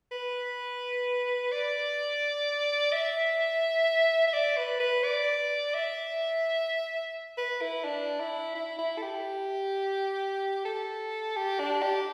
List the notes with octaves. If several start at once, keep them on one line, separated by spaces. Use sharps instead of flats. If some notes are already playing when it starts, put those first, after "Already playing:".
B4
D5
E5
E5
D5
B4
B4
D5
E5
B4
E4
D4
E4
E4
E4
A4
G4
A4
G4
D4
G4